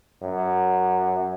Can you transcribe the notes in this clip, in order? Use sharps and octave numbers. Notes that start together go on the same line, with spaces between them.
F#2